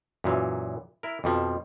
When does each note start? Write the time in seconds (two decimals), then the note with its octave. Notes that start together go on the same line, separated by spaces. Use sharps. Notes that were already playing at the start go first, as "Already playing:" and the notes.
0.24 F#2 A#2 E3
1.03 E4 A#4
1.24 F2 B2 F3